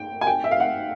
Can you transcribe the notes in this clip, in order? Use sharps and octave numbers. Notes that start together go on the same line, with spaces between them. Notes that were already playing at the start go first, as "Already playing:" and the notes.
Already playing: G5
G#5
G5
E5
F5
F#5